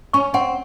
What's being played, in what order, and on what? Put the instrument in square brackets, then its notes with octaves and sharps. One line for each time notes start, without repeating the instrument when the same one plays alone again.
[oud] C#4 [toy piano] C#6
[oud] C4 [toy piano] F#5